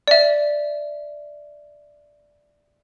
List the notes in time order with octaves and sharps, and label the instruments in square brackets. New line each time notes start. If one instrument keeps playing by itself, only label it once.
[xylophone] D5 E5